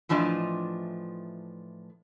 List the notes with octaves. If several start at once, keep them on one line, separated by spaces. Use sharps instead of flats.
A2 E3 F3 D4 D#5